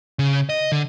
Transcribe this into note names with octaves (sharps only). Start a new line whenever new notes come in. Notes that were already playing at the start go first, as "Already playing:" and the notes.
C#3
D#5
D3